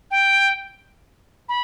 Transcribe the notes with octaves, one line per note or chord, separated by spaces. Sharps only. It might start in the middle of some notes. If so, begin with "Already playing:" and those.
G5
B5